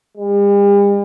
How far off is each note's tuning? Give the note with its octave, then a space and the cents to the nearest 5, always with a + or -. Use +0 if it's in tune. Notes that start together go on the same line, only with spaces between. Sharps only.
G3 +45